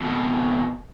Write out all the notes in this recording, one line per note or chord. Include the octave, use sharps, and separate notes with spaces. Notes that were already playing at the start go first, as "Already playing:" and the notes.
F2 B2